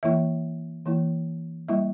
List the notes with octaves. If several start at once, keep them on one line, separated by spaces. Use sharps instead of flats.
E3 A#3 E4 E5
E3 A#3 E4
G3 A#3 E4 E5